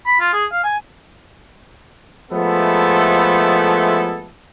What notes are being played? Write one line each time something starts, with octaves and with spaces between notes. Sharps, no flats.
B5
F4
G#4
F5
G#5
F3 G#3 A3 B3 E4 A4